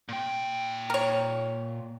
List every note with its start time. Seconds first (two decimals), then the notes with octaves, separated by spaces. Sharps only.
0.09 A#2 G5
0.90 A#4 C#5